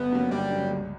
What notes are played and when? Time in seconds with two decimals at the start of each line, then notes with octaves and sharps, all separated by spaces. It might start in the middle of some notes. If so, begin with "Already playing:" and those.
Already playing: G1 B3
0.12 G2 F#3 A#3 C#4
0.31 G1 G3
0.51 G2 F#3 A#3 C#4
0.71 C#2